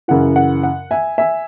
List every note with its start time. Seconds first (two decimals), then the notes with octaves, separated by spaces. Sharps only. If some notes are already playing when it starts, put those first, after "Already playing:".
0.08 F#2 C#3 E3 F#5
0.36 F#5
0.63 F#5
0.91 E5 G#5
1.18 E5 G#5